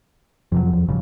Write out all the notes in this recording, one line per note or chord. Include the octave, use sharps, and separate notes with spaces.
F2 C3 F3 F#3
E2
A1 G2 C#3